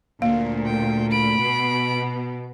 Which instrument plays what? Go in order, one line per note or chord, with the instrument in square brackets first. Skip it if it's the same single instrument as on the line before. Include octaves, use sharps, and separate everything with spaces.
[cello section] D2 A#2 [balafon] A#3
[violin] G5
B5 D7
[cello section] B2 B3